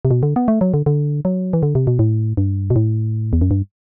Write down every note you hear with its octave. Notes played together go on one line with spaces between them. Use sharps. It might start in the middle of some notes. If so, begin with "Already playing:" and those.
C3
B2
D3
B3
A3
F#3
D3
D3
F#3
E3
D3
C3
B2
A2
G2
B2
A2
E2
F#2
G2